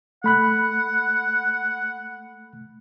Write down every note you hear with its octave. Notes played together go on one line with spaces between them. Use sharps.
A3 F#5 B5 F#6